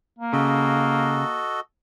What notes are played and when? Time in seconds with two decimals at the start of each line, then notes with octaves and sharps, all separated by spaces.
0.19 A#3
0.33 C#3 F#4 A4 D#5